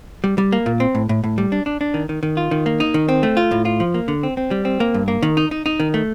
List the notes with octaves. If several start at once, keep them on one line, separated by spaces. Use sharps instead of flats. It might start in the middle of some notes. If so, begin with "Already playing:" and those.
G3
G3
A#3
A#2
C4
A2
A2
A2
G3
D4
D4
D4
D#3
D#3
D#3
F4
D#3
A#3
D#4
D#3
C4
A3
F4
A2
F4
F3
A#3
D3
C4
C4
G3
C4
A#3
G2
A#3
D#3
D#4
D#4
D#4
D#3
A3